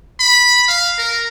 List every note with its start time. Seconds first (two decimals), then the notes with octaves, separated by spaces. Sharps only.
0.20 B5
0.68 F5
0.98 A#4